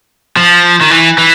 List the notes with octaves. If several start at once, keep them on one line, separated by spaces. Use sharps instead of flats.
F3
D#3
E3
E3